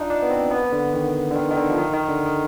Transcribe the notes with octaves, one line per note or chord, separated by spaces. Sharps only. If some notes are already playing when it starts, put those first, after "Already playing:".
Already playing: D4 D#4 F4
D4
B3
C4
B3
D3
D#3
D3
D#3
D#3
D3
F3
D#3
D#3
D3
D#3